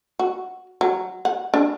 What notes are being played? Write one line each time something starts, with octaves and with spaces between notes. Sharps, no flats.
F#4
F#3
F#5
D4